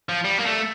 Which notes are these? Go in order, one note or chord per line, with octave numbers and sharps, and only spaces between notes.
F3
G3
A#3
A3